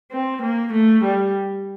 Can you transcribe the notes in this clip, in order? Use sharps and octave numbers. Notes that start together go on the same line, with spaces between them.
C4
A#3
A3
G3